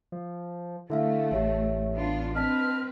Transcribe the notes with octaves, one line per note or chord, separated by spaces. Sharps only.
F3
D3 A3 E4 E5 F5
A1 G4 C#5 E5
B3 D4 F4
C4 B4 D#5 A5 F6 B6